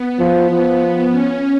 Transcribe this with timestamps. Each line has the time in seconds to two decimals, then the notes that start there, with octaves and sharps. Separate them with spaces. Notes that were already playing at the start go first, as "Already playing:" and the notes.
Already playing: B3
0.19 F3
0.50 F3 B3
1.10 C#4